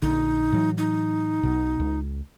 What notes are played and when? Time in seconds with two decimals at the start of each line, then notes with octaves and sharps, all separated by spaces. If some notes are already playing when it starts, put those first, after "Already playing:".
0.02 A#1 D3 D#4
0.52 A2 E3 F#3
0.78 D#4
1.43 B1 B2
1.80 C#2